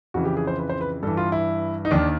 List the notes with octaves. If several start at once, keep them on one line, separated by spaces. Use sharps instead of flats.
F2 C#3 E3 F#4
G4
G#4
C5
B4
C5
B4
G2 E3 A4
F4
E4
D#4
D#2 D#3 D4